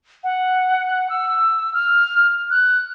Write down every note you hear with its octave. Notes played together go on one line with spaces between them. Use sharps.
F#5
E6
F6
F#6